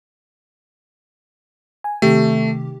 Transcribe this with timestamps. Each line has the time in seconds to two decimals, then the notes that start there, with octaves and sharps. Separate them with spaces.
1.84 G#5
2.02 C3 D#3 A3 G4